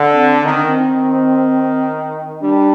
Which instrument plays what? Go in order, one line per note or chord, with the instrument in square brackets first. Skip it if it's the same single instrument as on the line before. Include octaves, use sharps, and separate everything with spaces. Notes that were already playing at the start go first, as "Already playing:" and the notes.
Already playing: [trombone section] D3
[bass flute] C4
[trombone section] D#3 [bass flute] C4
[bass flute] D4
C4
[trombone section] D#3
[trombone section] G3 [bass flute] D4